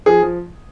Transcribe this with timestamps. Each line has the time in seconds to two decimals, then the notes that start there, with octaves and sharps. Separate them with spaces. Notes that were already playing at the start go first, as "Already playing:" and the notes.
0.06 F3 G#4
0.22 F3